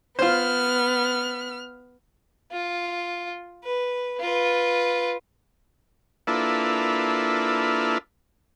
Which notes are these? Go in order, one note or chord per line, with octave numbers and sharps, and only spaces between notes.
B3 F4 C5 F6
F4
B4
F4 B4
A#3 D4 E4 F4 A4 B4